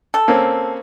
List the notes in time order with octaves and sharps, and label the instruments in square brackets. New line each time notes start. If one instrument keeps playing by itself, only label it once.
[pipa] A4
[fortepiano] A#3 C4 C#4